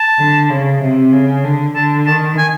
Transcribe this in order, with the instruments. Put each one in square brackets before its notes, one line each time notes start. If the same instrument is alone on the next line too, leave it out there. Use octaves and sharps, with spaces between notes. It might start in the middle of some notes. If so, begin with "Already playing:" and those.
Already playing: [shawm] A5
[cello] D3
C#3
C3
C#3
D3
[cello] D3 [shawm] A5
[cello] D#3 [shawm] A5
[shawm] G#5